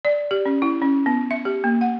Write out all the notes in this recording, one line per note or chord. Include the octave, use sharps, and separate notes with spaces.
D5
G4
C#4
E4
C#4
B3
E5
G4
A#3
F#5